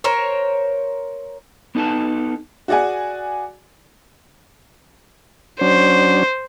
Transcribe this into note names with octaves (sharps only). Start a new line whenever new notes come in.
A#4 C5 C#5
B3 D#4 G#4 A4 B4 A5
F#4 G#4 D5 F#5 G#5
F#3 C#4 D4 C5